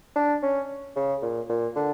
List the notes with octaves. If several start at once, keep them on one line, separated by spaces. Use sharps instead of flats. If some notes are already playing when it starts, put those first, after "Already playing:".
D4
C#4
C#3
A#2
A#2
D3